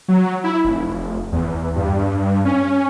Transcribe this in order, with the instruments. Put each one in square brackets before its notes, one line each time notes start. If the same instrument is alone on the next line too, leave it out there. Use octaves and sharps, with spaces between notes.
[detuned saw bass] F#3
E4
F1
E2
G2
G2
C#4